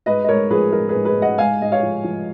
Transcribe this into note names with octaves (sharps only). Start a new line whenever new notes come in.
G#2 B4 D#5
D#5
G#2 A#4 C#5
F3 G#4 B4
F3 A#4
G#4 B4
G#2
G#4 B4
G#2
D#5 F#5
G#2 F5 G#5
G#2 D#5
C#5 F5
F3
F3